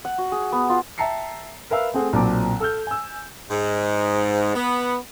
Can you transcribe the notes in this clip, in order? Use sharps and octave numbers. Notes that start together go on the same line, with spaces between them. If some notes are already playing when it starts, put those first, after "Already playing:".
F#5
F#4
G#4
B3
F4
E5 G5 A5 A#5 C7 C#7
A#4 B4 E5 F5 B5 E6
A3 C4 G#4 F#5
B1 A#2 F#3 C4 A5 D6
A4 E6 F6 G6
G#5 E6
G#2
B3